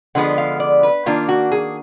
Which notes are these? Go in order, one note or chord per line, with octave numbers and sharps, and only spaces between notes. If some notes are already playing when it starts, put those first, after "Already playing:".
D3 F3 G#3 B3 F#5
F5
D5
B4
D#3 A#3 D4 F4
F#4
G#4